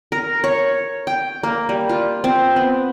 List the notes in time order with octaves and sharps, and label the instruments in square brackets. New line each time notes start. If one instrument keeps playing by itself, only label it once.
[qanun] A#4
C#5
G5
A#3
G3
F4
C4
B3